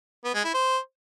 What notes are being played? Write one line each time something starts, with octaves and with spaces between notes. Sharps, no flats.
B3
G#3
E4
C5